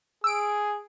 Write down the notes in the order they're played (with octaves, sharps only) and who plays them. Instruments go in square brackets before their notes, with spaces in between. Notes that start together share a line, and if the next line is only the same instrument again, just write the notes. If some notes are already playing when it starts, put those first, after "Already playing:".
[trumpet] G#4 [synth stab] E6 D7